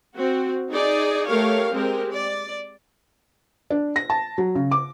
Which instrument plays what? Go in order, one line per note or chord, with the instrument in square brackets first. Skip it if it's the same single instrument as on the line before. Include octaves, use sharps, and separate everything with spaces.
[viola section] C4 F#4
D#4 G#4 D5
A3 G4 A#4 C#5 F5
G#3 C4 G4 A#4
D5
[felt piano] D4
A#6
A5
F#3
C#3
D6